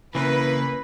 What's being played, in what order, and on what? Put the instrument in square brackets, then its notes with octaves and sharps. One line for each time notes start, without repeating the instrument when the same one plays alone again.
[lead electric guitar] C#3 A#3 [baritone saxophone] E3 [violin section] B4